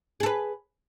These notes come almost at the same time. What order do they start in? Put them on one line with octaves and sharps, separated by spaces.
G#4 A4 B4